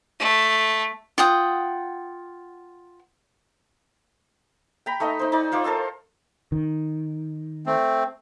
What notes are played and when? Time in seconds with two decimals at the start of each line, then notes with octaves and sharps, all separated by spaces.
0.20 A3
1.18 F4 F#5 G5 D#6
4.86 G5 A#5 B5
5.00 A3 D#4 D#5
5.19 D#4 C5
5.32 D#4 D5
5.52 F4 C5 D#5 D6
5.64 A4 A#4 A5 E6
6.52 D#3
7.66 A3 C4